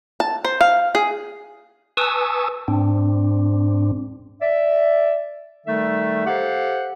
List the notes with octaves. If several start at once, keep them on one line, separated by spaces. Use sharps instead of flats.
A5
C5
F5
G#4
B4 G#5 A5 C#6 D#6 E6
G#2 C4 D4
D5 E5
D#3 G3 A3 D#4 A4 E5
G4 A4 C5 F5 F#5